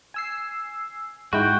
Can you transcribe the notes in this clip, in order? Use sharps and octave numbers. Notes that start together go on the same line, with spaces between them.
G#5 E6 C7
G#2 G#3 E4 F#4 G5